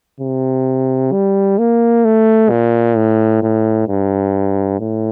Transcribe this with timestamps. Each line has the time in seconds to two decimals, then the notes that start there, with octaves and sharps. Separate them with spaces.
0.20 C3
1.12 G3
1.59 A#3
2.05 A3
2.50 A#2
2.96 A2
3.43 A2
3.88 G2
4.80 A2